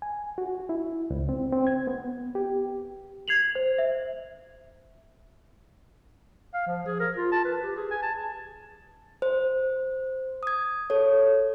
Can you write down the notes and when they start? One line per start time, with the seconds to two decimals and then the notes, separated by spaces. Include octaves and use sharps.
0.02 G#5
0.38 F#4
0.69 E4
1.11 C#2
1.29 C4
1.52 C4
1.67 G#6
1.87 B3
2.35 G4
3.28 G#6 C7 F7 F#7
3.55 C5
3.78 E5
6.54 F5
6.67 F3
6.86 G#4
6.99 A#4
7.17 F4
7.32 A5
7.44 B4
7.63 G4
7.76 G#4
7.91 G#5
8.02 A5
9.22 C5
10.43 D#6 G#6
10.90 A4 C#5